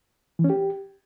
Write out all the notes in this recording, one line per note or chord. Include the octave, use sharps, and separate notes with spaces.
E3
C#4
G4